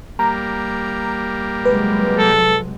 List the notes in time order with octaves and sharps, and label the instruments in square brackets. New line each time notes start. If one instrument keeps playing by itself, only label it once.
[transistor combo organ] G3 A#3 [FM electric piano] A#5
[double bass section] C3 F#3 G#3 [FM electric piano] B4
[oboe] A4